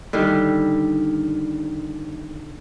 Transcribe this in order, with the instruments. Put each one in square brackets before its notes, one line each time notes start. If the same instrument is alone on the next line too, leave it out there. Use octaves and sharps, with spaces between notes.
[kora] D3 D#3 G3